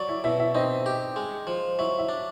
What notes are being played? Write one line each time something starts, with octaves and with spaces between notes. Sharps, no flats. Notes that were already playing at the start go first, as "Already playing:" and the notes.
Already playing: F#3 D5
E4 E5
B2 E4 E5
E4 E5
C4 D#4 D#5
G4
G#3
F3
F#3 E4 E5
E4 E5
D4